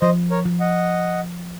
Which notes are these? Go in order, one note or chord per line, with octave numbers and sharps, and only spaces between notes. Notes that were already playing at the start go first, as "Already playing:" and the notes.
F3 C5 D#5
A#4 C#5
F3
D#5 F#5